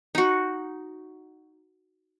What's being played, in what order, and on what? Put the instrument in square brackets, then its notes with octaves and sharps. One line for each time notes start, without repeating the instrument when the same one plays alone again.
[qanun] D#4 F#4